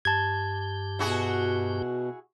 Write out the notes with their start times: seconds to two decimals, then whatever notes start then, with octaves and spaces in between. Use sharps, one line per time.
0.05 G2 G4 A5 G#6
0.99 B2 E4 F#4 G#4